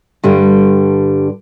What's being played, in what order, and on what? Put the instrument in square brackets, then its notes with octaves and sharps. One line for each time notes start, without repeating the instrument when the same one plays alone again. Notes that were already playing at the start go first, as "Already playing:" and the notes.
[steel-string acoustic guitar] G2 D3 G3